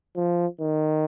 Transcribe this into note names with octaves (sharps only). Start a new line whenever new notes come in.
F3
D#3